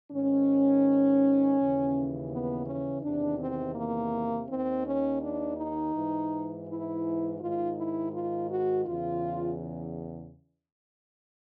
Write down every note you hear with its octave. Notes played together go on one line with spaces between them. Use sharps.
G#2 D#3 C#4
D#2 C#3 E3
B3
C#4
E2 C3 D#3 D4
C4
A#3
D#2 D#3 C4
C#4
D4
D#4
G#2 E3
E4
G#2 D#3 F4
E4
F4
F#4
E2 C#3 E3 F4